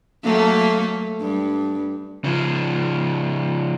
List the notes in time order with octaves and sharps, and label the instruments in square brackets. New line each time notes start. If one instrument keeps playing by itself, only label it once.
[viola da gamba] F#3 A3 A#3
G2
[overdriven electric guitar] C#3 F3